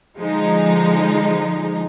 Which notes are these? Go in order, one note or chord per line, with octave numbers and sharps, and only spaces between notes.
D3 F3 G#3 D#4